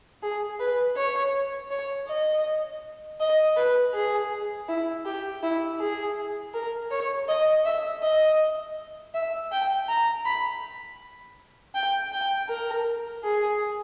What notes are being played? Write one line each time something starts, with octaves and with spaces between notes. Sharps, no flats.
G#4
B4
C#5
C#5
D#5
D#5
B4
G#4
E4
G4
E4
G#4
A#4
C#5
D#5
E5
D#5
E5
G5
A#5
B5
G5
G5
A#4
G#4